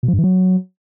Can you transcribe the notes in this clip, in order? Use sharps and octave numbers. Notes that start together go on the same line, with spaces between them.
B2
F3
G2
E3
F#3